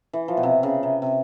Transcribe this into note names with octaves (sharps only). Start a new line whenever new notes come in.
E3
F3
B2
C3
C#3
C3
C3